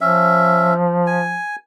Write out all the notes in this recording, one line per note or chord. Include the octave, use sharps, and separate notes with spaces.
F3 C#4 E5
G#5